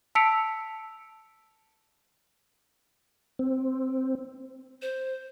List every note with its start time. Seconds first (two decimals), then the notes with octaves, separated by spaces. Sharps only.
0.15 A5 E6 B6 C#7 D7 F7
3.39 C4
4.82 C5